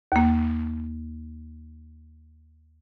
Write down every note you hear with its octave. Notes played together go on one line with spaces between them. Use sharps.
D#2 A#3